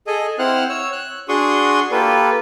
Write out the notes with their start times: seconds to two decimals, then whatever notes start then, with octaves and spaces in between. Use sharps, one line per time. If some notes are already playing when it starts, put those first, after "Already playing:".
0.07 G#4 A4 D#5 G#5
0.39 C4 E4 C5 F#5 F6 F#6
0.69 C#5 E6
0.92 F#6
1.29 D4 F#4 G#4 C6 C#6 D#6
1.92 A#3 F4 G4 A4 B4